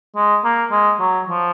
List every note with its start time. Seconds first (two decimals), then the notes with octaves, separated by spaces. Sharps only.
0.16 G#3
0.44 A#3
0.71 G#3
1.00 F#3
1.28 F3